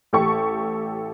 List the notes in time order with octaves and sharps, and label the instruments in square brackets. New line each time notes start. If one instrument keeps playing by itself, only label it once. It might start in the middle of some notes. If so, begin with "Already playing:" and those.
[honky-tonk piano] A1 G4 A4 C#6